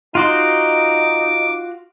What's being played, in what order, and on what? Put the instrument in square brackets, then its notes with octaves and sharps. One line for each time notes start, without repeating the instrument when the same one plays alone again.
[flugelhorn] D#4 [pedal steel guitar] F4 F#4 C6 [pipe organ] D6